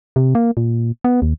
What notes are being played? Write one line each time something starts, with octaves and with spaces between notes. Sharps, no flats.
C3
A#3
A#2
B3
D#2